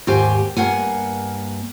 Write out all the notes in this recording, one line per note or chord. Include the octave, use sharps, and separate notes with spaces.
D#2 G#2 G4 C5 G#5
G2 A#3 F#5 G#5